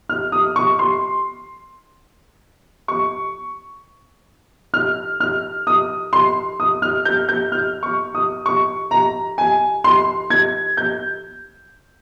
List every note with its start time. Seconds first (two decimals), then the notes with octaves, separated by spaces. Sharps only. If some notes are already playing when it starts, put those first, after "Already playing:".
0.09 F6
0.32 D#6
0.56 C#6
0.79 C6
2.88 C#6
4.74 F6
5.20 F6
5.67 D#6
6.13 C6
6.60 D#6
6.82 F6
7.05 G6
7.29 G6
7.52 F6
7.83 C#6
8.15 D#6
8.46 C#6
8.91 A#5
9.38 G#5
9.84 C6
10.30 G#6
10.77 G6